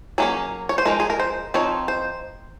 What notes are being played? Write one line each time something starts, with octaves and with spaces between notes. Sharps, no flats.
F#3 A#3 C#4 G#4
C#5
C5
F3 G#3 D#4 A#4
G#4
A#4
C5
F3 C4 D#4 C#5
C5